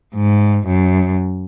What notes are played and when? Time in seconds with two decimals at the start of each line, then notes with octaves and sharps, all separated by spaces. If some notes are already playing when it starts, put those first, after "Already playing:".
0.15 G#2
0.66 F#2